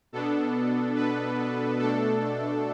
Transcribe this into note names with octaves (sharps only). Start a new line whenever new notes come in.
B2 B3 D4 A4
B4
B2 A3 D4 A4